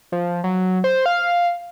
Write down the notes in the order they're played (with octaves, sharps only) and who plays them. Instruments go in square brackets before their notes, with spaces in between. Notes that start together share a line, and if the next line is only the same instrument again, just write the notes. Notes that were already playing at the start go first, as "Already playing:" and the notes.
[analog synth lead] F3
F#3
C5
F5